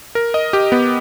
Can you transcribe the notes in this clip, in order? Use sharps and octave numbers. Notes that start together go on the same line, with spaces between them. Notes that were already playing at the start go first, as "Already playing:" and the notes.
A#4
D#5
G4
B3